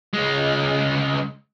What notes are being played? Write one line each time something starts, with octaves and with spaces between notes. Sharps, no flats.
C#2 G#3